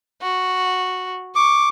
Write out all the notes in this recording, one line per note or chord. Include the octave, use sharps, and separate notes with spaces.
F#4
C#6 D6